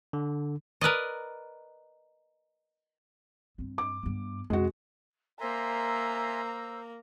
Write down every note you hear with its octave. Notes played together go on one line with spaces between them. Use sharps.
D3
A#4 B4 D5 D#5
G2 C4
D6
G2 B3
F2 C3 G#3 F#4
A#3 A#4 C5 E5 G#5 A#5 C6 E6